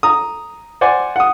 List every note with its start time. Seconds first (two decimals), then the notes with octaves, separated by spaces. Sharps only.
0.03 A#5 D#6
0.81 C5 D5 F#5 G#5
1.16 F#5 D#6